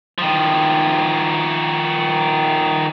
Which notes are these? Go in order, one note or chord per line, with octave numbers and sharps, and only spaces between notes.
D#3 F3